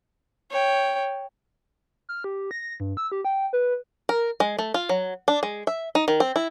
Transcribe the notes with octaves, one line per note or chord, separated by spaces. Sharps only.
C#5 G5
F6
G4
A#6
G2
E6
G4
G5
B4
A#4
G#3
A3
F4
F#3
D4
G#3
E5
D#4
D#3
C4
E4